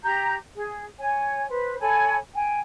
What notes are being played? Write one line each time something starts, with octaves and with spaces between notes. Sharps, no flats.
G4 A#5 G6
G#4
C#5 G#5
B4 C5
A4 C#5 G#5 B5
G5 G#5